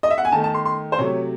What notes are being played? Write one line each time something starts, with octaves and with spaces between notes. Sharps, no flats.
D#5
E5
F#5
G#5
D#3 A3 A5
A5
C6
C6
C5
C3 F#3 A3 C#5